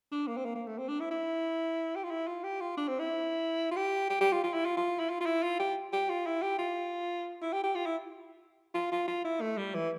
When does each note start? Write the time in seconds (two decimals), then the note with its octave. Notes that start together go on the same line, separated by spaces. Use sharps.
0.11 D4
0.27 A#3
0.37 C4
0.45 A#3
0.55 A#3
0.67 A3
0.78 C4
0.88 D4
1.00 E4
1.11 E4
1.96 G4
2.03 F4
2.10 E4
2.27 F4
2.44 G4
2.61 F4
2.77 D4
2.88 C4
2.99 E4
3.71 F4
3.77 G4
4.10 G4
4.21 G4
4.32 F4
4.43 F4
4.53 E4
4.65 F4
4.77 F4
4.99 E4
5.09 F4
5.20 F4
5.26 E4
5.43 F4
5.59 G4
5.93 G4
6.09 F4
6.26 E4
6.42 G4
6.58 F4
7.42 E4
7.53 G4
7.64 G4
7.75 F4
7.86 E4
8.74 F4
8.92 F4
9.08 F4
9.24 E4
9.41 A3
9.58 G3
9.75 E3